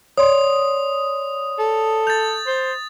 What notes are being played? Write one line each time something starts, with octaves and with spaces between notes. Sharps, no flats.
C#5 D5 C6 D#6
A4
G6 A6 F7
C5